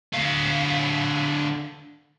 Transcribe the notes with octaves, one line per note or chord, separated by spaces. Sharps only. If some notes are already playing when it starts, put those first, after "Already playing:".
D3 F5